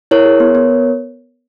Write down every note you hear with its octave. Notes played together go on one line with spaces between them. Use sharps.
E4 A#4 C#5
G#4
B3
B3